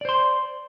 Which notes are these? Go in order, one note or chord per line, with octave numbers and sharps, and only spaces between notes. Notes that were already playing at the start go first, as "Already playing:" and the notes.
C5 D5 C6